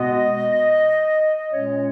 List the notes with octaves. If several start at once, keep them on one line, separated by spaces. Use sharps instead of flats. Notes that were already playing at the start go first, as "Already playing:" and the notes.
Already playing: B2 G#3 B3 D#5
A#2 G#3 C#4 C#5